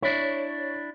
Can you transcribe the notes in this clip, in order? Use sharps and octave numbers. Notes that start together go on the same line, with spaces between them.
D4 E4 C#5